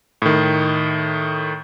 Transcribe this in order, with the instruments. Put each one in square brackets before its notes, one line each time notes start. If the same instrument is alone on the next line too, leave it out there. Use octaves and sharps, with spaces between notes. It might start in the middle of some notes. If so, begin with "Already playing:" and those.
[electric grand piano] A2 D#3